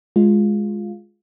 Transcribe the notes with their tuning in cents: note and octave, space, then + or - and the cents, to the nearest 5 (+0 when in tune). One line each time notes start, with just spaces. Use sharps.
G#3 +0 F4 +5